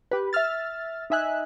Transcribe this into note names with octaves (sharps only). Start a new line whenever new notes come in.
G4 B4
E5 E6 F6 A6
D#4 D#5 E5 G#5 F#6